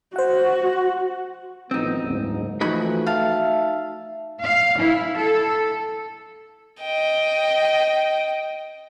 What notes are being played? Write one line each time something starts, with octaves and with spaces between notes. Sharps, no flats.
F#4 C5 F#5
A1 D#3 F3 B3 C4 D#4
F#1 D2 G#2
E3 F3 A3 D#4 F#4 B5
E5 F5 A5
F5
E4
A4
D#5 G5